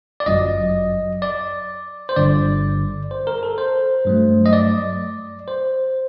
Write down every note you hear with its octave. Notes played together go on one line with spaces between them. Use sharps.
D5
G1 F#2 F#3 D#5
D5
C5
G1 G2 D3 D5
C5
A#4
A#4
A4
C5
G2 F#3 A3
D#5
D5
C5